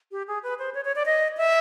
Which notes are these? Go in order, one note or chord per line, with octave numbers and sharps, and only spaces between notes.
G4
G#4
B4
C5
C#5
C#5
D5
D#5
E5